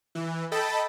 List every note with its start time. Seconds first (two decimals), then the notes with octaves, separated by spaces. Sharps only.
0.15 E3
0.52 A4 D#5 G5 A5 B5